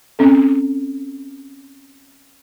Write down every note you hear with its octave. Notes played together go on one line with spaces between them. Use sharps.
C4 C#4 A4